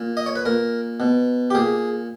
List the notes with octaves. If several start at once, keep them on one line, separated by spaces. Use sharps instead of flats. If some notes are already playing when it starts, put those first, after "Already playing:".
Already playing: A#2
D#5
C#5
B4
A#2 A#4
B2
G4
A#2 G#4